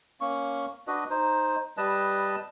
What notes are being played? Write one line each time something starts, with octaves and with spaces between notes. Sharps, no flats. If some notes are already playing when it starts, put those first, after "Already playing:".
A#3 C#4 C#6
D4 F#4 B4 D#5
D#4 C5
G3 B4 D#5 A5